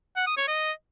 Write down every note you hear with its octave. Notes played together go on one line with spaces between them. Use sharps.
F#5
D#6
C#5
D#5